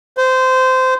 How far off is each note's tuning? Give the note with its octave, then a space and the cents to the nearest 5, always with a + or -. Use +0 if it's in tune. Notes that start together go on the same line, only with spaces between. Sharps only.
C5 -20